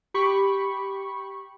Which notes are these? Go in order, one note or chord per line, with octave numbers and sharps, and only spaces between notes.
G4 B5 C#6